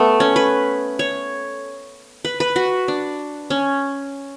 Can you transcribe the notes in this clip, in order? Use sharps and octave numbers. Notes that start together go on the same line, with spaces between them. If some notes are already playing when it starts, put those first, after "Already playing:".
Already playing: A3 B3
C#4
B4
C#5
B4
B4
F#4
D4
C#4